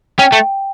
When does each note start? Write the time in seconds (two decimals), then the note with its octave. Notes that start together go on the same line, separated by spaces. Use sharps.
0.19 C#4 G5
0.33 A3